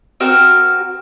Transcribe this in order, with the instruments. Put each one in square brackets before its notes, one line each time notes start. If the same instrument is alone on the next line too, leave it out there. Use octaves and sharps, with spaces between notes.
[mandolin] C4 F#4 A#4 F6